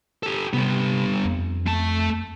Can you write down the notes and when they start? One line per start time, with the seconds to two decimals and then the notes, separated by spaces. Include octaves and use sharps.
0.23 G4 A4
0.53 C3 G3 B3
1.25 F2
1.66 A3 A5